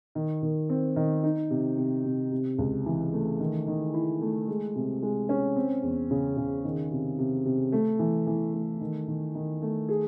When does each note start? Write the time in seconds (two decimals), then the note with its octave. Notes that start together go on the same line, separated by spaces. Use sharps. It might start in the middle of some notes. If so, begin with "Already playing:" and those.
0.15 D#3
0.42 D#3
0.69 C4
0.96 D#3
1.23 D#4
1.50 C3
1.78 C3
2.05 C3
2.31 C3
2.58 C#2
2.86 E3
3.13 A3
3.40 D#3
3.67 D#3
3.94 E4
4.21 A3
4.48 G#3
4.75 C3
5.02 G#3
5.29 C#4
5.56 C4
5.83 E2
6.11 C#3
6.37 C#3
6.65 D#3
6.92 C3
7.19 C3
7.45 C3
7.72 A3
7.99 E3
8.27 E3
8.54 A3
8.81 D#3
9.08 D#3
9.35 D#3
9.62 A3
9.89 G#4